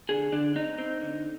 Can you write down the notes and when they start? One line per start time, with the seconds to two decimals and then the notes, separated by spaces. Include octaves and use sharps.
0.09 D3 G#4
0.32 D3 D4
0.55 C4 D#4
0.78 C4
1.01 D3